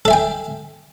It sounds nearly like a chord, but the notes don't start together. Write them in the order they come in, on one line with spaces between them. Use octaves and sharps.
A4 E5 G#5 G5